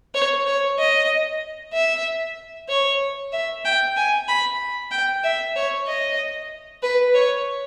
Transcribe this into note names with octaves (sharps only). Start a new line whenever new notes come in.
C#5
C#5
D#5
E5
C#5
E5
G5
G#5
B5
G5
E5
C#5
D#5
B4
C#5